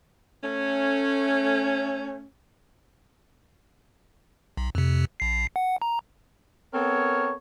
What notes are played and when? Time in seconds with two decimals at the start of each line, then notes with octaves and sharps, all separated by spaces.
0.44 A3 C#4
4.57 B1
4.75 F2 C3
5.20 A#1 C7
5.56 F#5
5.82 A#5
6.74 B3 C4 A4 A#4 C#5